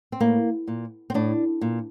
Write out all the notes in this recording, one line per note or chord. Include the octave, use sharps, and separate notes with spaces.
C4
A2 A#3
A#2
C4
A2 D4
A#2